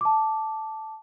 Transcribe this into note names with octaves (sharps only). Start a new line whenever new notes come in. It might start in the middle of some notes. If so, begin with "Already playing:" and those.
A5 D6